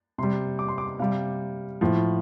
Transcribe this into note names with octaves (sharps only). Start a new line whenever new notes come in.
C3 G3 C6
D6
C6
D6
C3 G3 F5
A2 F3